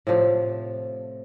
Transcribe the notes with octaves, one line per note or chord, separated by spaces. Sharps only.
A2 C3 F3 D4